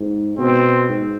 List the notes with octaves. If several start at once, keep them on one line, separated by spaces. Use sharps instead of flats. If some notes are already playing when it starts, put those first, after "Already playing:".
Already playing: G#2
B2 C4
G#2